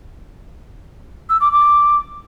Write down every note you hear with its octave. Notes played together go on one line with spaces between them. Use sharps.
E6
D6
D6